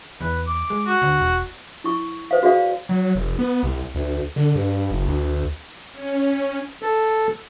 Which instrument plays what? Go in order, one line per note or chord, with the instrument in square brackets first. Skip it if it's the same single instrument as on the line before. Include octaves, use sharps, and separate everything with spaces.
[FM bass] E2 [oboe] B4
[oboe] D6
[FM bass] G#3
[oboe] F#4
[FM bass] D2
E1
[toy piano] E4 C#6
B4 C5 F5
F#4 G#4 D5 F5
[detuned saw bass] F#3
F1
B3
C2
D2
D3
G2
F#1
D2
[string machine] C#4
[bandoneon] A4